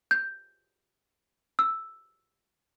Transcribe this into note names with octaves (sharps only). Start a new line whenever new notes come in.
G6
E6